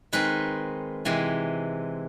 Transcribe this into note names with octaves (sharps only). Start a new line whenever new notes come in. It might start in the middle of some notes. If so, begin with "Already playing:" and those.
D#3 G#3 C4 D#4 B4
C3 E3 G#3 C4